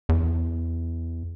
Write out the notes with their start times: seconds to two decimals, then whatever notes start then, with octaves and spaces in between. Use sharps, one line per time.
0.09 E2